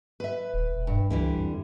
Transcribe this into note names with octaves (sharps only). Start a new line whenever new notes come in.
B4 E5
D#1
E1
G2
C#2 D3 E3 G3
F2